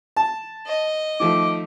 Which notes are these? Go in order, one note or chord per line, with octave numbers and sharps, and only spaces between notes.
A5
D#5
D#3 F3 A3 D6